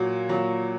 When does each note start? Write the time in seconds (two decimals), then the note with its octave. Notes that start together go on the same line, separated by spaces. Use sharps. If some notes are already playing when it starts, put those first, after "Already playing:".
Already playing: A#2 F#3 F#4
0.29 A#2 F#3